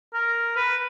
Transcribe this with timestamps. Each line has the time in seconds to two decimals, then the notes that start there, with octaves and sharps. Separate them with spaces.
0.14 A#4
0.56 B4